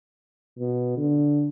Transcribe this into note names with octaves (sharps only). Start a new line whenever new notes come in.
B2
D3